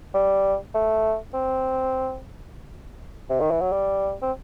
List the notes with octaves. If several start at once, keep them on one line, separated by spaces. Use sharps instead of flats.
G3
A3
C4
C3
D#3
E3
F#3
G3
C4